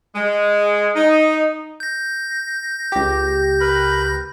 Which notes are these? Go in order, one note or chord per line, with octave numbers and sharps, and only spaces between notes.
G#3
D#4
G6 A#6
C#2 G4
A#4 B4 B5